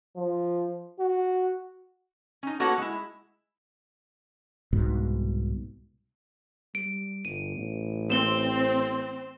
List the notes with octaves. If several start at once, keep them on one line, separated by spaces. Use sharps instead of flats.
F3
F#4
C#4 D#4
A#3 B3 F#4 A4 C#5 F#5
G#3 E4
C2 G#2 B2
G3 D7
G1 D#7
A1
C4 E7 G7